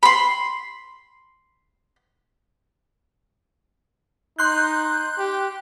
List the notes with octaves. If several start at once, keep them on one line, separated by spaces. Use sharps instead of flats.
B5 C6
D#4 C6 F#6 G6
G4